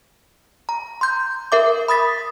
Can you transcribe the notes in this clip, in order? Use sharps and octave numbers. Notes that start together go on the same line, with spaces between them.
A#5
C6 G6
A#4 E5 D6
B5 D#6 A6 B6